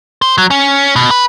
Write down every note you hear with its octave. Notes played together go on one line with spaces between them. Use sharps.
C5
F#3
C#4
B2
B4